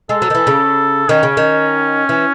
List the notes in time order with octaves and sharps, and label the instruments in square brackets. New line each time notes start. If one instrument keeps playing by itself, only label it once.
[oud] G#3 [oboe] A4
[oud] F#3
D#3
E3
C#3
[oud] D#3 [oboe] C#4
[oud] C#3
D#3
E3